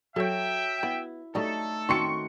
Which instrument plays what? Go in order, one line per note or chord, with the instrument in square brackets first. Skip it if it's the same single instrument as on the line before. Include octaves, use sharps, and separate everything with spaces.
[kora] F#3 [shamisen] A4 C#5 [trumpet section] E5 G5
[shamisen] B3 [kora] E4
[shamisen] F#3 G3 D4 [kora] A3 D#4 [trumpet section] A4
[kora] D#3 F#4 [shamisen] C4 C#4 G5 [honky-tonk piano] C6 C#6 C#7